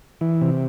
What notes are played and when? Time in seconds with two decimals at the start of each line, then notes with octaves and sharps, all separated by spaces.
0.21 E3
0.41 C3